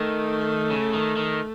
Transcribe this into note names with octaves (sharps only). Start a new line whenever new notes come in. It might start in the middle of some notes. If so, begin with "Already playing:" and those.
Already playing: D#3 A3
C#3
D#3
D#3